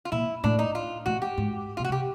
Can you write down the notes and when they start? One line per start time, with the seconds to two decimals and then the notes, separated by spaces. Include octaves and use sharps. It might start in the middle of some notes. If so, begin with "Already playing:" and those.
0.05 F4
0.12 A#2 E4
0.44 A2 D4
0.59 D#4
0.75 F4
1.06 A2 F#4
1.22 G4
1.38 G#2
1.77 B2 F4
1.84 F#4
1.89 C3
1.92 G4